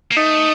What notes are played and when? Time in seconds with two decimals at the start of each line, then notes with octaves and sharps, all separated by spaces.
0.12 A#3
0.17 A3 D#4